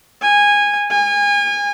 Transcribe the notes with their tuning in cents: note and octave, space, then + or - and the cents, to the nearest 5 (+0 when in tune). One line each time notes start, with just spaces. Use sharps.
G#5 -15
G#5 -30